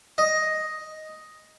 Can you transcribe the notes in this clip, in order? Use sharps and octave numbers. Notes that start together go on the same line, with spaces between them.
D#5